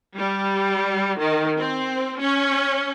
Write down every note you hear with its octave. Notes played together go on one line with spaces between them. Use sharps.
G3
D#3
C4
C#4